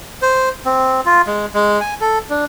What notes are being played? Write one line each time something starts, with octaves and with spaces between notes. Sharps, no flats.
C5
C4
F4
G#3
G#3
G#5
A4
D4